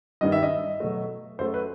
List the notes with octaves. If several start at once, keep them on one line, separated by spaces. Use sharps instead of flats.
G2 D#3 G3 D#5
E5
D#5
B2 F#3 A3
F#2 F#3 A3 C5
B4